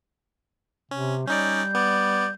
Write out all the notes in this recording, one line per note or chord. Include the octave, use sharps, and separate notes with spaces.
C3 C#4
G3 C#4 D#4 D5 G6
B3 D5